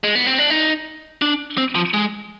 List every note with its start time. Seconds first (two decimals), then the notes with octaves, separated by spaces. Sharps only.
0.04 G#3
0.15 B3
0.27 C4
0.38 D4
0.50 D#4
1.22 D4
1.58 C4
1.75 F3
1.94 G#3